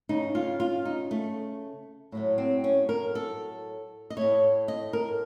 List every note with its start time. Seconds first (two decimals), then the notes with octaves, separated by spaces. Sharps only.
0.09 C#3 A3 D#4
0.35 F4
0.60 F4
0.85 D#4
1.11 A3
2.12 A2 F#3 A3
2.38 C4
2.64 C#4
2.89 A#4
3.15 A4
4.10 D#5
4.17 A2 A3 C#5
4.68 D#5
4.93 A#4